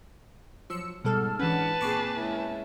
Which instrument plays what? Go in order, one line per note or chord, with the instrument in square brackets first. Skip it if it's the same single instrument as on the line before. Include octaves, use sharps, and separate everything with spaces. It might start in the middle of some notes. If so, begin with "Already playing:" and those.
[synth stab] F3 E6 C#7 [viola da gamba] F#3
[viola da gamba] G#2 [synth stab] B2 G3 A4 [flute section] A5 E6 F6
[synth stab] E3 C#4 [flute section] D4 F#5 [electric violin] B4 A5
[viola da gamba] A#2 C4 G#4 [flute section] G#5 [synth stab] C#6 D6 C7
[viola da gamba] G#3 C#4 E4